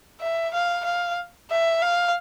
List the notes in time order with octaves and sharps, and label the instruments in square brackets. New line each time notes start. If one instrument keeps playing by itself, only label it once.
[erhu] E5
F5
F5
E5
F5